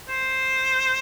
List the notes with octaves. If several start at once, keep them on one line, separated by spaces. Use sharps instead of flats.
C5